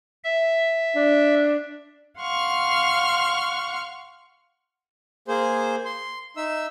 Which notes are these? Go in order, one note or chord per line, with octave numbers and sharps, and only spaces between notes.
E5
D4
F5 F#5 C6 C#6 F6
A#3 G#4 C5
C6
D#4 E5 E6